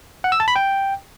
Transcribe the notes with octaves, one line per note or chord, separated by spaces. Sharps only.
F#5
E6
A5
B5
G5